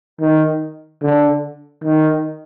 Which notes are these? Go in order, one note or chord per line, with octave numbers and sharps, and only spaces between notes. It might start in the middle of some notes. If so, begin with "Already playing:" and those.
D#3
D3
D#3